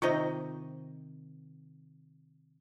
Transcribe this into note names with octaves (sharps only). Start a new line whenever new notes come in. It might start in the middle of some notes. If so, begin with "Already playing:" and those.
C3 D#3 F4 C5 D#5